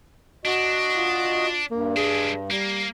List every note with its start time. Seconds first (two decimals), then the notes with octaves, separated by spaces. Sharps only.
0.45 D4 F#4 D#5
0.97 F4
1.71 G2 A#3
1.97 G#3 D4 G#4
2.51 G3 A#3